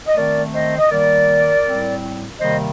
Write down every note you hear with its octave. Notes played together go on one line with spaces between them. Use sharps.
D#5
D#3 A3 C4 A#4 D5
C5 D#5
D#5
D#3 G3 A#3 A#4 D5
A2 G3 C4
C3 D#3 G3 A#3 C5 D#5